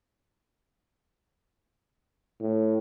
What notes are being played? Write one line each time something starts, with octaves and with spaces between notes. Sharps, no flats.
A2